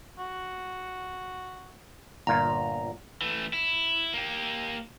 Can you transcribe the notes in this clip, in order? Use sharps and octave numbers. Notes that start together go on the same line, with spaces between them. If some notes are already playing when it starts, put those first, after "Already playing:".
F#4
G1 A#2 F4 A#5
E3 A3
E4
A#3 G4